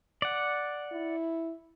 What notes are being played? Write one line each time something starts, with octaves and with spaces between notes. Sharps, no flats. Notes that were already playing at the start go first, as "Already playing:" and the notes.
D5 F#5
E4